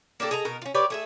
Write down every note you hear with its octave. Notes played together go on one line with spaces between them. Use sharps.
A#3 D4 G4 A4
G#4 A4 D#5 A#5
B2 D#4 A#4
C#4 F4
G4 B4 C#5 D5
A3 G#4 E5